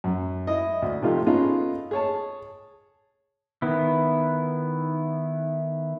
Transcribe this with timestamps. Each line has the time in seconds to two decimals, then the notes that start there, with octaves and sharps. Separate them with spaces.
0.04 F#2
0.47 E4 D#5
0.82 D2
1.02 C3 F3 A3 D#4 F4
1.26 B3 C#4 D#4 F4 G#4 A4
1.91 G#4 C#5 A5
3.62 D#3 B3 E4